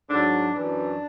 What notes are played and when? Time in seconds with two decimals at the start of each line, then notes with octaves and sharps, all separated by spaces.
0.10 G#2 F#3 D4
0.54 F#2 E3 D4